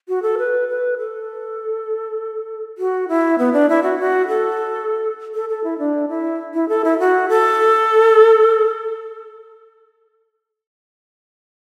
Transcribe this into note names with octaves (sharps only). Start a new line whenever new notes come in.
F#4
A4
B4
B4
A4
F#4
E4
B3
D4
E4
F#4
F#4
A4
A4
A4
E4
D4
E4
E4
A4
E4
F#4
A4